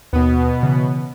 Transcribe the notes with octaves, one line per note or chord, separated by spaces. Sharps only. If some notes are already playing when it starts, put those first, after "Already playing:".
D#2 B2 B3 D#6
C#3 E3